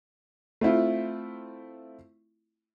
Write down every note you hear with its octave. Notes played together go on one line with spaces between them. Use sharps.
A3 C4 E4 F4